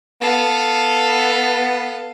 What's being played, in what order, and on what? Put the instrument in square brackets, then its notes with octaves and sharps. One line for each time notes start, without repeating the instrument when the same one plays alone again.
[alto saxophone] B3 [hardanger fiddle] A4 F5